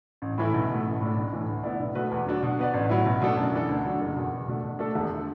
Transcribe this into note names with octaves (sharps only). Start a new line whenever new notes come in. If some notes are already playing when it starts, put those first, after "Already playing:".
A1
A2 E3 A3 E4
B1
B2 A3
A1
A2 A3 D4
B1
A2 E3
D2
D3 B3 E4 D5
B1
B2 A3 F#4 B4
E2
D3 F#3 D4 F#4
B2
B3 F#4 B4 D5
A1
A2 F#3 B3 E4
B1
B2 A3 D4 A4
F#2
E3 A3 D4 A4
D2
D3 F#3 D4 F#4
F#1
E2 B2
E2
B2 A3 D4
B2
A3 D4 A4
E1
D3